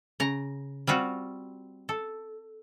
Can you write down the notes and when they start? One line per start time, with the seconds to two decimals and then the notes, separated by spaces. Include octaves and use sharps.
0.20 C#3 A#5
0.87 G3 C4 F4 F#4
1.89 A4